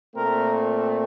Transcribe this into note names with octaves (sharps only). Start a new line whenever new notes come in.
A#2 A3 C4 A#4